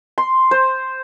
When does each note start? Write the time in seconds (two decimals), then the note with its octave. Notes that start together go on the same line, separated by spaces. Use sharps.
0.18 C6
0.51 C5